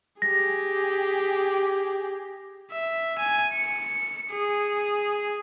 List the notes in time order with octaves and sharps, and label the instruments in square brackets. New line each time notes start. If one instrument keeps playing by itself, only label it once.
[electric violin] G4 G#4 [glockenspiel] A#6
[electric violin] E5
G#5
C#7
G#4